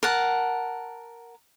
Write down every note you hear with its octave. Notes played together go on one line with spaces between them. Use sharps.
A#4 F#5 A5